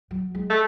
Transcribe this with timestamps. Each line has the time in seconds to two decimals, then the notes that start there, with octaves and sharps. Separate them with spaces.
0.11 F#3
0.35 G#3
0.50 A3